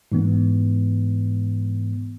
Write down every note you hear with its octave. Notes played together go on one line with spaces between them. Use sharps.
G#2 E3 B3